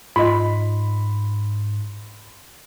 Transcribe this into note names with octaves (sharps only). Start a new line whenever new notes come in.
G#2 F4 D#5 B5 C6